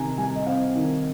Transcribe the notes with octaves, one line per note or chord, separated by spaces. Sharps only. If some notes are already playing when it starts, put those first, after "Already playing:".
Already playing: C3 D#3 G#5 A#5
G3 G#5
D#5
C4 F5
D#3